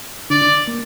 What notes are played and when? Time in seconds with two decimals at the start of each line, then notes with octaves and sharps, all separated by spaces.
0.30 D3 D4 D5
0.67 A#3